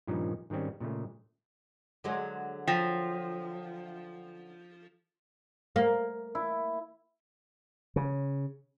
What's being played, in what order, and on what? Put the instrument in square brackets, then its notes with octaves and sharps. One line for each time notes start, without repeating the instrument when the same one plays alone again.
[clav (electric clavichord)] G2 A#2 D#3 F3 C#4 D#4
G#2 D#3 G3 C4 C#4
A#2 C#3 G#3 A3
[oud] D3 F#3 G#3
[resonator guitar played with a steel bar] F3 [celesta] G5 A#6 B6
[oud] A#3
[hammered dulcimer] E4
[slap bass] C#3